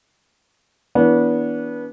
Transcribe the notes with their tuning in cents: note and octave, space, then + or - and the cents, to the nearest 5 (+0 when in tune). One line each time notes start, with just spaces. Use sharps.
E3 -10 B3 -25 D4 -35